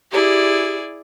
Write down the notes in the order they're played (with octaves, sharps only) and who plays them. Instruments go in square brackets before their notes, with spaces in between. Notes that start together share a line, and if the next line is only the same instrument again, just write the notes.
[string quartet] E4 G#4 D5 [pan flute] G4